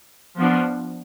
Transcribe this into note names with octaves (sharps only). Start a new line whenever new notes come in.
F3 B3 D4